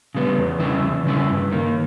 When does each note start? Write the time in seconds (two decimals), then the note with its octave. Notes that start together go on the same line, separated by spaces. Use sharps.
0.15 C#3 G3 B3
0.38 E2
0.60 C#3 G3 C#4 E4
0.83 E2
1.06 C#3 G3 C#4 E4
1.29 G2
1.52 D#3 A#3